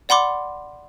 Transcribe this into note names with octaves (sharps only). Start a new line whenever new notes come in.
D5 F#5 B5 C6 D6